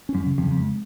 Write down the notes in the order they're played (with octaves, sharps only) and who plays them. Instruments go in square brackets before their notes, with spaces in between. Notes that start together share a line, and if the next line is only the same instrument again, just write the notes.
[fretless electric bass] C#4
[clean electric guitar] F#2
[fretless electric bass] C#3
[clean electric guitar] F2
[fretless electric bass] C#3
[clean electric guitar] F2
[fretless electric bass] G#3